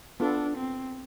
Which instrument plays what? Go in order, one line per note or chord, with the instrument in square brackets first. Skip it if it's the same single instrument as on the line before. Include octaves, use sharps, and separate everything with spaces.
[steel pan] B3 F4 A4 [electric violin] D4
[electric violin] C4